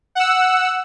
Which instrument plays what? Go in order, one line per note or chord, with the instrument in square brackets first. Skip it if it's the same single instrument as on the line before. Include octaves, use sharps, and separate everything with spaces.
[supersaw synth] F#5 E6